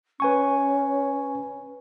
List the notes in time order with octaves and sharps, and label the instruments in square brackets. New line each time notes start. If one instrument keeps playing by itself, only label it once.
[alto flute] C#4 [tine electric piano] B4 G#5 C#6